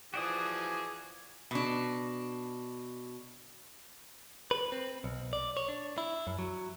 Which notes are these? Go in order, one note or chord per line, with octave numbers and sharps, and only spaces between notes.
E3 F3 F#4 G#4 D5 D#6
B2 D4
B4
C4
B1
D5
C#5
D4
E4
F#2
F#3